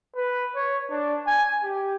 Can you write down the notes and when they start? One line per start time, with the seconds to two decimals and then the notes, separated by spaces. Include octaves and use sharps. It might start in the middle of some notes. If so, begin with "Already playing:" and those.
0.16 B4
0.55 C#5
0.91 D4
1.27 G#5
1.63 G4